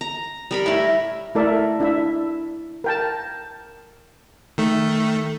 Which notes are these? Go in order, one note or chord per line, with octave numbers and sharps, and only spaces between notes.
A#5
G3 A#4 B5
A2 E4
A3 E4 A4 A#4 D5 E5
D4 E4 E5
A#4 G5 A5
D#3 A3